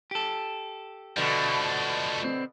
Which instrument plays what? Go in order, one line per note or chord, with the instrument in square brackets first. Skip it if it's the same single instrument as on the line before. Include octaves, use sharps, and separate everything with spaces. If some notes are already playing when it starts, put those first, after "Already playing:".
[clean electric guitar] G4 A4
[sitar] B2 D3 [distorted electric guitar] F3 A3
[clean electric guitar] C4